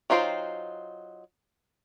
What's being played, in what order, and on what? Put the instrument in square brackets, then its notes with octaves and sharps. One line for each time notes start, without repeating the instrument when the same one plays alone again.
[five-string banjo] F#3 D#4 F4 C5 G5